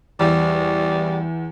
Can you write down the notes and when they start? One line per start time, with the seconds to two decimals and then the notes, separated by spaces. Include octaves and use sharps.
0.19 E2 G3